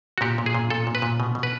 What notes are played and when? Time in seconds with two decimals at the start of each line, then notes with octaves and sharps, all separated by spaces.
0.18 F#4
0.21 A#2 G4
0.38 A#2
0.46 G#4
0.55 A#2
0.70 A#2 A4
0.87 A#2
0.95 B4
1.02 A#2
1.20 B2
1.35 B2
1.43 B4